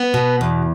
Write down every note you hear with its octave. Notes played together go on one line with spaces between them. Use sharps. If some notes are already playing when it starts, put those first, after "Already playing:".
Already playing: B3
B2
E2